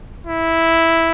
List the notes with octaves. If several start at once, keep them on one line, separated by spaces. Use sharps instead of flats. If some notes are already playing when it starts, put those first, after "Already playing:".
E4